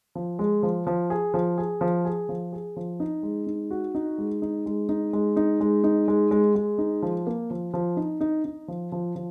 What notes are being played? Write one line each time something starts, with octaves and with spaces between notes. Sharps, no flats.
F3
G#3
F3
F3
G#4
F3
G#4
F3
G#4
F3
G#4
F3
D#4
G#3
D#4
F#4
D#4
G#3
D#4
G#3
D#4
G#3
D#4
G#3
D#4
G#3
G#3
G#3
D#4
F3
A#3
F3
F3
D#4
D#4
D#4
F3
F3
F3